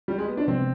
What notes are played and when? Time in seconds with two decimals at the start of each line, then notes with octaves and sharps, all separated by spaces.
0.08 G3
0.18 G#3
0.28 B3
0.37 D4
0.48 C3 F3 G#3 B3 C4